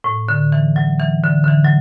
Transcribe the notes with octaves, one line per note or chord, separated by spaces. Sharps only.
A2
D3
E3
F#3
E3
D3
D3
E3
F#3